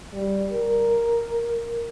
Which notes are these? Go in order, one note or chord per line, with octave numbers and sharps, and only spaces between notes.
G3
A#4